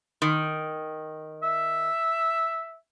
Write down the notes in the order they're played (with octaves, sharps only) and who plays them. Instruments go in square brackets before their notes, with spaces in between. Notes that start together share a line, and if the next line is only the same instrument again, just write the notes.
[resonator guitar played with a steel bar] D#3
[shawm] E5